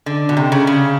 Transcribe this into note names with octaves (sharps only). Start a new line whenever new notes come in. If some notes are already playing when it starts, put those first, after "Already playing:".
D3
B2
C3
C#3
C#3